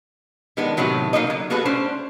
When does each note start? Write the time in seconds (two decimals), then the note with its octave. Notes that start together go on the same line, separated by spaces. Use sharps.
0.57 D#3 G#3 B3 D4
0.77 A2 C3 D#3 F#3 B3
1.13 F#3 A#3 B3 D#4 D#5
1.27 D3 F#3
1.50 A#3 B3 F#4 G#4 A4 B4
1.65 A3 C#4 D4 C5